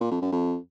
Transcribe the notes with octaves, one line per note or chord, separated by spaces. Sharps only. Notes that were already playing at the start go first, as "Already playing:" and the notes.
A#2
F2
F#2
F2